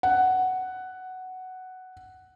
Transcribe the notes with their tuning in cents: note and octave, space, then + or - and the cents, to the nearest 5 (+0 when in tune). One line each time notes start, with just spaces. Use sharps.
F#5 +5